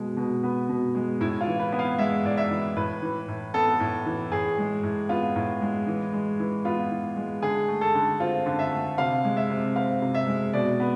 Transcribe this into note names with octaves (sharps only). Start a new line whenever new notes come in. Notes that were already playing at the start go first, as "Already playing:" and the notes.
Already playing: B2 G#3
B2
B3
B2
G#3
A2 E4
F4
E3
B4
B3
F5
G#3 E5
A2 D5
E5
E3
A2 B4
E3
A2
B3 A4
A2
E3
A2 G#4
G#3
A2
B3 F4
A2
G#3
E3
G#3
E3
B3 F4
E3
G#3
D3 G#4
A3
A4
D3
C4 F4
D3
E5
A3
C3 F5
G#3
E5
C3
C4 F5
C3
E5
G#3
B2 D5
B3